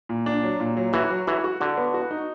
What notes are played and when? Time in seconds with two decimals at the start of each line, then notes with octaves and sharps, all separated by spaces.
0.09 A#2
0.26 D4
0.43 F#3
0.60 A#2
0.77 F#3
0.93 E3 F#4
1.10 F#3
1.27 E3 F#4
1.44 F#4
1.60 D3 F#4
1.77 B3
1.94 F#4
2.11 D#4